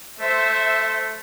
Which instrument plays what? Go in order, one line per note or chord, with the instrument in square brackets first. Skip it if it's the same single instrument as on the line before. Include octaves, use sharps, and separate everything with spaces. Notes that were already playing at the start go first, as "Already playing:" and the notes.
[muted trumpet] A3 [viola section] C5 E5